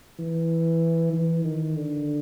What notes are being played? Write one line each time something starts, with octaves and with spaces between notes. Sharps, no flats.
E3
E3
D#3
D3